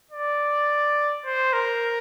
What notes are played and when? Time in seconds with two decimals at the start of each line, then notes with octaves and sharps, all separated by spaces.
0.11 D5
1.26 C5
1.53 A#4